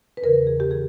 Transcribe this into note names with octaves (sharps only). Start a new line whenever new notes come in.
B4
E2 C#3 E3 A#4
G#4
G4
C#3 E3 G#4